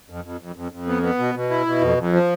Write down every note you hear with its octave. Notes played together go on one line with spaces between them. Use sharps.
F2
F2
F2
F2
F2
B3
B3
B2
B2
E4
B2
F2
F2
F3